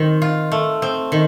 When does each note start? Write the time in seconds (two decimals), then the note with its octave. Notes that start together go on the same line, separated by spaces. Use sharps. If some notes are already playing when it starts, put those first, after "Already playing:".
Already playing: D#3 C4 A#4
0.22 F4
0.52 A3
0.82 C4
1.12 D#3